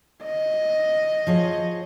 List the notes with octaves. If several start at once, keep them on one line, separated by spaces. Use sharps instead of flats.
D#5
F3 G#4 C#5